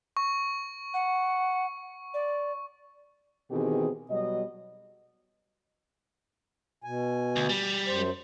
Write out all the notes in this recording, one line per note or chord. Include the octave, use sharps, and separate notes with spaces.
C#6
F#5
D5
B2 D#3 E3 C4 G4 G#4
B2 F#3 G3 D#5
B2 G#5
D2
G3
F#2 C5